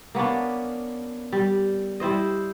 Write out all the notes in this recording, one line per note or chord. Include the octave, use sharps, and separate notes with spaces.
A#3 B3 C#4 D4
G3
G3 E4 C5 D#5